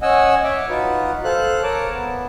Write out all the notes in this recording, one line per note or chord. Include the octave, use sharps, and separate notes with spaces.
C#4 D#5 F#5 G#5 E6
C#5 E5 D6
D#4 F4 F#4 B4
A4 C5 F5 F#6
A#4 C#5 A5 D6
B3